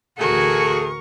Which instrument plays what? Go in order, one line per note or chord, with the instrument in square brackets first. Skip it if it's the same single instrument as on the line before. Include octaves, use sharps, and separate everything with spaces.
[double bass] A1 D2 [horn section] A3 G#4 [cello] F#4 [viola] A#4 C#6